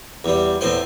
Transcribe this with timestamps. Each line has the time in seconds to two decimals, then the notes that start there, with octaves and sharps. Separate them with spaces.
0.24 E2 G3
0.61 E2 A2 C4 C5